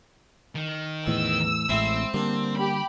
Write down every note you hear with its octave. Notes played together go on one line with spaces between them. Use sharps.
D#3
E2 A2 E3 E6
A1 A2 G#3 C4 E4 E5
D3 G3 A#3 D4
G4 B5